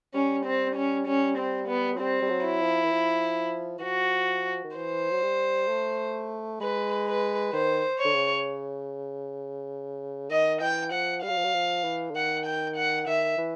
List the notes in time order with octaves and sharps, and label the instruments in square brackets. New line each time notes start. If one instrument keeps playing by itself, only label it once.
[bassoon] G3 [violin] C#4
[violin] C4
C#4
[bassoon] G3 [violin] C#4
[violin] C4
B3
[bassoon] F#3
[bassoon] G3 [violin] C4
[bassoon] G3
F#3
[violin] E4
[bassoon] F3
E3
F3
E3
[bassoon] F3 [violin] F#4
[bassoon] D#3
[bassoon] E3 [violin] C5
[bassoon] F#3
G3
A3
[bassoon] G#3 [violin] B4
[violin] B4
[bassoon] D#3 [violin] C5
[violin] C#5
[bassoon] D3
C#3
[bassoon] D#3 [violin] D#5
[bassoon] E3 [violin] G5
[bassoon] F3 [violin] F#5
[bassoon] G3 [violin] F5
[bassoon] F#3
F3
F#3
F3
E3
D3
[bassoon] D#3 [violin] F#5
[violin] G5
F#5
[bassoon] D#3 [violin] E5
[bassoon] E3